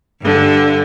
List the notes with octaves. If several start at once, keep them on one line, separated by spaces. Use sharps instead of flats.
G2 D3